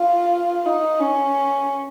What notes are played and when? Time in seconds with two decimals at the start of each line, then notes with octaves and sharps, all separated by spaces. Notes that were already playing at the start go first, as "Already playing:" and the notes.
Already playing: F4
0.66 D#4
1.00 C#4